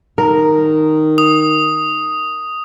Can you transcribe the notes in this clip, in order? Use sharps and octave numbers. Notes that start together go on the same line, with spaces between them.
D#3 A#4
D#6